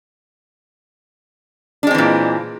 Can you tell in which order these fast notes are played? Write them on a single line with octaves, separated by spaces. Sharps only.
D4 G#3 C4 E3 A#2